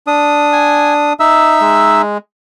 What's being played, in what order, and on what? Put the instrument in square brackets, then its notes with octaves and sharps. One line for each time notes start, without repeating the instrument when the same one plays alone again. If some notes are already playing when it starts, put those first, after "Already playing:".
[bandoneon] D4 D#6
[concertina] G#5
D#4 E5 E6
[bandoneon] G#3